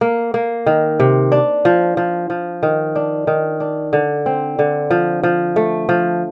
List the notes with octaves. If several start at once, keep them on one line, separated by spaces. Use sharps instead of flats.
A#3
A#3
D#3
C3
D4
F3
F3
F3
D#3
D4
D#3
D4
D3
C4
D3
F3
F3
A3
F3